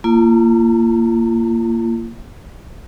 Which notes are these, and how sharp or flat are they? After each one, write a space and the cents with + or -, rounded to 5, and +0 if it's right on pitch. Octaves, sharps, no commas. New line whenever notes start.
A#3 -15 F4 -40 A5 +45